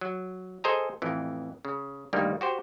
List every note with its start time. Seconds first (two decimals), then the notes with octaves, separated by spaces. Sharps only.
0.01 F#3
0.64 G#4 A4 C5 D#5 G#5 A#5
1.02 A1 F2 E3
1.65 C#3
2.13 D2 G2 D#3 G3 A#3
2.41 F#4 G4 C5